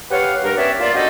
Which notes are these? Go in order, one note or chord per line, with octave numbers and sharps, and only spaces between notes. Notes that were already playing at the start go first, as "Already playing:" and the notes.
G4 B4 C#5 F5 F#5
G2 A#4
B3 C#4 G4 C#5 D5 E5
A#3 F4 D5
C#4 D4 F#4 A4 C5 D#5